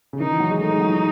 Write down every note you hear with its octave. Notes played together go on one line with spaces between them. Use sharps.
C#3
D#3 D#4
E3
F#3
G#3
A3 D#4
G#3
F#3
E3